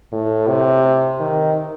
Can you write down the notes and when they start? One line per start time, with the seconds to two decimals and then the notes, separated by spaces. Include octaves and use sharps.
0.12 A2
0.48 C3
1.20 D#3